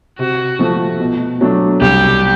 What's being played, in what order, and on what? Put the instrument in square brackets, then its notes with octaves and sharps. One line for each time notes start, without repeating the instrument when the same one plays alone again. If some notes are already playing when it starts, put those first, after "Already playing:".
[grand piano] C3 [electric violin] F#4
[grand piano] F3 A3
B2
F#3 A3 D4
[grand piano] C2 [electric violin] G4